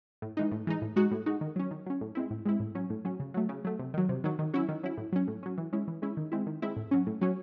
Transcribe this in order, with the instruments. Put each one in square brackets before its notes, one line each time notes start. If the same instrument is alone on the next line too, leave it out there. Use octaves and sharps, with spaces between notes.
[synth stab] A2
E3 G#3 D#4
A2
E3 G#3 D#4
A2
G#3 D#4 F#4
A2
G#3 D#4 F#4
D#3
F#3 C#4
D#3
F#3 C#4
A2
G#3 C4 E4
A2
G#3 C4 E4
A2
F#3 C#4
A2
F#3 C#4
C#3
F#3 A3
C#3
F#3 A3
C3
D#3 F#3
C3
D#3 F#3
D#3
F#3 C#4 E4
D#3
F#3 C#4 E4
A2
F#3 C#4
A2
F#3 C#4
E3
G#3 C#4 E4
E3
G#3 C#4 E4
D#3
G#3 C4 E4
D#3
G#3 C4 E4
A2
F#3 C#4
A2
F#3 C#4